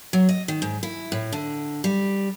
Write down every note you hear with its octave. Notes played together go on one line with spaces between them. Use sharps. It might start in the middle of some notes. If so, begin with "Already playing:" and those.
F#3
D#5
D#3
G#2
E4
A2
D3
G3